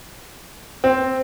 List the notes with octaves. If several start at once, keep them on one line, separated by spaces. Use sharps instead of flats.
C4